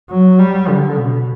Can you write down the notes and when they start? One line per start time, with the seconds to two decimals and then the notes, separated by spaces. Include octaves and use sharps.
0.10 F#3
0.39 G3
0.69 D3
0.97 B2